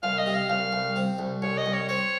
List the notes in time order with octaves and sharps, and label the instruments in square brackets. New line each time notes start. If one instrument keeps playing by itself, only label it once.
[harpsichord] C2 [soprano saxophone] F5
[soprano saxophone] D#5
[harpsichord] C3
[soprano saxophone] F5
[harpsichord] C2 [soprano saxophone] F5
[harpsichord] C2
C3
C2
[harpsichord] C2 [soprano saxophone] C#5
[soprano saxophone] D#5
[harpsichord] C2
[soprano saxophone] C#5
[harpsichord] C4 [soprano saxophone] C#5